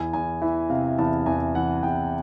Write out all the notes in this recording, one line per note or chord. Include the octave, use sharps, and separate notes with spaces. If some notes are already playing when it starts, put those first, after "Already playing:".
Already playing: E2 G#5
E2 G#5
E3 E5
C3 F5
E2 A5
E2 G#5
E3 F#5
E2 G5